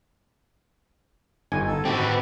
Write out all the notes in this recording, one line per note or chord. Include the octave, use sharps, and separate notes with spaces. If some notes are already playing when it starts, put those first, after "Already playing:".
G1 D#4 G#5
A4
C4 F#4 G4
B4